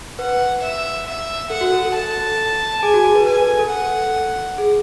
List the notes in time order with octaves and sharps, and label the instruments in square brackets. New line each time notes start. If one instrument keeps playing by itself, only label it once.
[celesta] B4 [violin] F#5
[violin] E5
E5
[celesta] A4 [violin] F#5
[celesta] F#4
A4
A4
[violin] A5
[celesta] G#4 [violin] G#5
[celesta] F#4
G#4
B4
[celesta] B4 [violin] G#5
[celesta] B4
A4
A4
[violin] F#5
[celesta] G#4